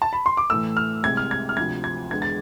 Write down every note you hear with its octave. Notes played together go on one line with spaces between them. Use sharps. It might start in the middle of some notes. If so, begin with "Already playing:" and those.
A5
B5
C6
D6
A2 E3 A3 E6
F6
C2 C3 G#3 G#6
F6
G#6
F6
D2 C3 F3 G#6
G#6
E2 D3 G#3 G#6
A6